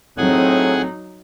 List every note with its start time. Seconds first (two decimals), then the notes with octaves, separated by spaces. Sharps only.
0.18 A2 F#3 C4 D#4 G#4 F#5 G#5